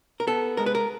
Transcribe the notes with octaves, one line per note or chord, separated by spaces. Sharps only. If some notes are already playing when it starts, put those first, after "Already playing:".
A#4
B3 A4
G#3 A#4
B4
A#4